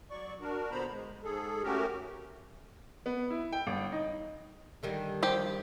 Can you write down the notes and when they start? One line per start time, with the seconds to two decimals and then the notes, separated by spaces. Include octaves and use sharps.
0.10 F#3 D5 C#6
0.40 D4 F#4 A#4
0.71 A#2 D3 B3 C5 A#5 B5
0.91 G#3
1.24 G#2 G#4 A4
1.63 A3 C#4 F#4 G4 A#4
3.06 B3
3.30 E4
3.53 G5
3.67 G1
3.92 D#4
4.83 D3 D#3 G3
5.23 F3 G4